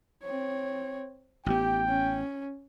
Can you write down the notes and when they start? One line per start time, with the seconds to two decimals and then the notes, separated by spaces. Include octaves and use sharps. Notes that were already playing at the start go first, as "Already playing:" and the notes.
0.23 C4 C#5
1.46 A1 B3 G4 G5
1.88 C#4